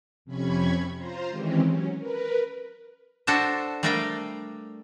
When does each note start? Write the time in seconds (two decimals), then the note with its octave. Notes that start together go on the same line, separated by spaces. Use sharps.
0.25 F2 C3 C#4 B5 C#6 G#6
0.96 F4 C5 A#5 C6
1.29 D#3 E3 G#3 C4 C#4 G4
1.64 F#3 C#4
1.96 A#4 B4
3.27 D4 F#4 A4 C5
3.83 G3 A3 D4 A#4 F5 G5